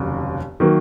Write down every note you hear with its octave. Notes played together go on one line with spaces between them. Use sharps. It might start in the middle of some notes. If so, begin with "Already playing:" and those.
Already playing: F1 D#2 C#3 F#3
D#3 F#3 A#3